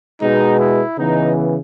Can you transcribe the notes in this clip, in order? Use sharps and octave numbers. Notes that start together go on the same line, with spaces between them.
B2 G#3 B3 D#4
E4
C#3 E3 B3 D#4